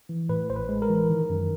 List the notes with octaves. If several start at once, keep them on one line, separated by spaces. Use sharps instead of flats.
E3
A2 B4
A1 C5
B4
G#3
A#4
E3
D#3
F#2